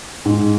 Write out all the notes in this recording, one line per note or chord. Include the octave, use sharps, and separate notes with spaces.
G#2